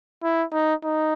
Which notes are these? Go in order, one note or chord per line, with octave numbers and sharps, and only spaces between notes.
E4
D#4
D#4